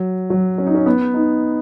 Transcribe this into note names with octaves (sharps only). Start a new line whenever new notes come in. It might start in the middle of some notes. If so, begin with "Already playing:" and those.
Already playing: F#3
F#3
C#4
D#4
C#4
B3
D#4